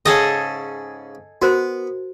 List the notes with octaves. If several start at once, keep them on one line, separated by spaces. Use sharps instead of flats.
G#2 C#3 C#4 G#4 A4 D#5
B3 F#4 A#4 C5